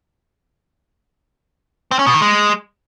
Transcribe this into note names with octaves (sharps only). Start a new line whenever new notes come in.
C4
C#4
B2
D#3
G#3